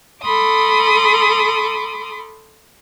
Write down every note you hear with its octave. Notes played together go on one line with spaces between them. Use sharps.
A4 B5 C6 D6 D#6